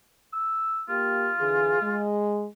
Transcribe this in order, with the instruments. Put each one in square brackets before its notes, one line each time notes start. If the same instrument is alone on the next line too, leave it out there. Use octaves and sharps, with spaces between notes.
[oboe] E6
[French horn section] A#3 G4 [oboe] F4
[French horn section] D3 E3 G#4
G#3